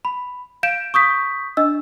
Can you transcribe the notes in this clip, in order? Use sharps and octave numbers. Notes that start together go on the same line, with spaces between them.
B5
F5 G6 D7 E7
C#6 D#6 G6 B6
D4 D#5 E6